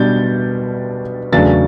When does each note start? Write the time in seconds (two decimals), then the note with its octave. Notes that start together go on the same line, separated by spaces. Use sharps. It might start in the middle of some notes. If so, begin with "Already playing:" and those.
Already playing: B2 G3 B3 D4 G6 A6
1.32 E2 C#3 F#3 A3 D4 A6